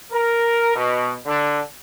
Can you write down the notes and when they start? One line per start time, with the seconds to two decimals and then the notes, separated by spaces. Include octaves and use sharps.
0.12 A#4
0.76 B2
1.26 D3